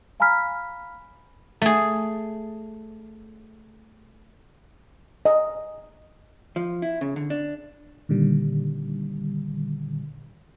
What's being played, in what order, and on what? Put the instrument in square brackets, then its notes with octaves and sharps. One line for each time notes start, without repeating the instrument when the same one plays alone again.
[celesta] F5 G#5 A#5 B5 F6 B6
[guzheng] A3 G#4
[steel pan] D#5
[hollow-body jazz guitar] F3
E4
C#3
D3
D4
[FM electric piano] A#2 D3 D#3 G3